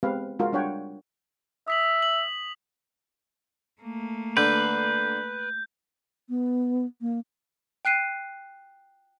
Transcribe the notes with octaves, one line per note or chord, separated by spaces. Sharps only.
G#3 B3 C4 G4 B4 F5
G#3 F4 F#4 A#4
G3 D4 C#5 F#5 G5
E5 D#6 B6 F#7
F#7
A3 A#3
D3 B4 G6
B3
A#3
G5 F#6 C7 D#7